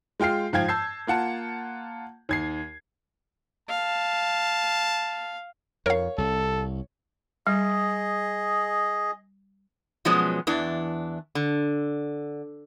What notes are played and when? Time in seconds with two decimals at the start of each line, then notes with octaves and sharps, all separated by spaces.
0.20 G#3 F4 G5 F6 C7
0.53 G#2 F3 F5 G5 G#6
0.68 A5 E6 G6 C7
1.07 A#3 F4 F#5 A5
2.29 D#2 G#6 C7
3.69 F5 A5
5.86 F2 A#4 C#5 F5
6.18 C2 A4
7.47 G3 G#4 D#5
10.05 B2 F3 F#3 G#3 B3 C#4
10.47 E2 E3 D4
11.35 D3